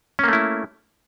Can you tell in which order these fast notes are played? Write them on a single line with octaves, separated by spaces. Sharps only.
C#4 A#3 A3 E4